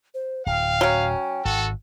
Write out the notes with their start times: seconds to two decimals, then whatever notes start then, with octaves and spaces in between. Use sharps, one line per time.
0.14 C5
0.46 D1 F5 G5
0.81 F#3 C#4
1.45 G#1 F#4 A4